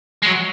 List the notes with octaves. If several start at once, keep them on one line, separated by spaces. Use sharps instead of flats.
G#3
F#3